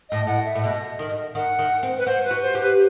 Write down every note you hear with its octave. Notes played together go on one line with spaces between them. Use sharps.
A2 D#5
A2 F#5
E5
A2
B2 D#5
D#3
D#3 F#5
D#3
C4
B4
F#4 C5
B4
F#4
C5
G4
B4